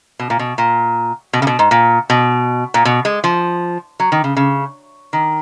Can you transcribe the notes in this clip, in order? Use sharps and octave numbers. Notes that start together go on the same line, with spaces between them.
B2
A#2
B2
A#2
B2
C#3
B2
G#2
A#2
B2
A#2
B2
G#3
F3
F#3
D#3
C#3
C#3
D#3